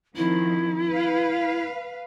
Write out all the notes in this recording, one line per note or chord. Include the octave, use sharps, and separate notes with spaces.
D#3 F3 C4 E4
B4 F5